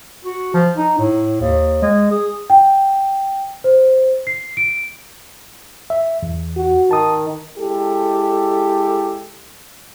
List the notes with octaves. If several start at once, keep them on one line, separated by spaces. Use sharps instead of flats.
F#4
F3
D#4
A2
D#2
G#3
G#4
G5
C5
C7
D7
E5
E2
F#4
D#3 A5 D#6
G#3 E4 G4 A4